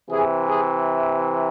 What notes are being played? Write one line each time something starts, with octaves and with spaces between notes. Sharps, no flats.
C3 E3 G#4
G#4